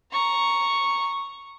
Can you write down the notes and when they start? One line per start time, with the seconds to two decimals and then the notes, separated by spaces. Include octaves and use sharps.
0.12 A#5 C#6